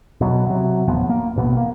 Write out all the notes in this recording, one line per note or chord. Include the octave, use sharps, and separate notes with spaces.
B2 F#3
C3 F#3
D#1 A2 F3 B3
A#3
A1 B2 B3
A#3